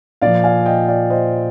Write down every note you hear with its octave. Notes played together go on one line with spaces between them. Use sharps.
A#2 F3 D5 F5
F5 G#5
D#5 G5
D5 F5
C5 D#5